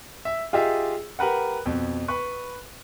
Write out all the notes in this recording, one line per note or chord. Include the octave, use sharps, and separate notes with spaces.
E5
F4 G4 G#4 D#5 E5
G4 A#4 B4 F#5
F2 B2
B4 B5 C#6